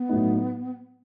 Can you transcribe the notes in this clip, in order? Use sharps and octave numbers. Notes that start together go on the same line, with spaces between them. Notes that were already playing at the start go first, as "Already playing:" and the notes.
Already playing: B3
A2 F#3 A3 D#4